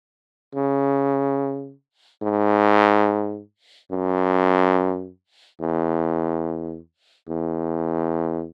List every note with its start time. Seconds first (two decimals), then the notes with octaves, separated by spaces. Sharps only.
0.55 C#3
2.22 G#2
3.91 F#2
5.60 E2
7.28 E2